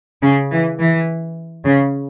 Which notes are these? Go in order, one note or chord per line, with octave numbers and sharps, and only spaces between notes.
C#3
E3
E3
C#3